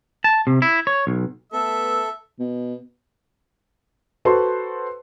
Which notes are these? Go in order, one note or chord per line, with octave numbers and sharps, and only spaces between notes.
A5
C3
E4
C#5
B1
A3 B3 A4 E5
B2
F#4 A4 B4 C5 C6